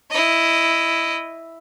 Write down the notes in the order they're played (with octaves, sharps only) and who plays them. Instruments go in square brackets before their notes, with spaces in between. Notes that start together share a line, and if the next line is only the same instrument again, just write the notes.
[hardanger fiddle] E4 D#5